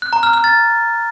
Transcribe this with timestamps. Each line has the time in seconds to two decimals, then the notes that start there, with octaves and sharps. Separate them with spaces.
0.02 F#6
0.13 A#5
0.23 F6
0.33 F6
0.44 A6